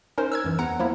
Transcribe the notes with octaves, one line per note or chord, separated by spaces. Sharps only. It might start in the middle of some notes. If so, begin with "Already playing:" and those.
C#4 D#4 A#4 C5
E6 F6 G#6
F#2 E3
E2 F#5 A#5
F3 A#3 E4